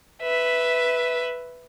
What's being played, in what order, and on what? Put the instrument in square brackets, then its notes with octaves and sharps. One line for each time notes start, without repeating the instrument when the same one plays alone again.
[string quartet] B4 E5